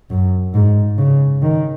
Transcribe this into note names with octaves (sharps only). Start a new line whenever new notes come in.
F#2
G#2
C#3
D#3